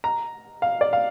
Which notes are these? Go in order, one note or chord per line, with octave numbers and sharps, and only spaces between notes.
A#5
F5
D5
F5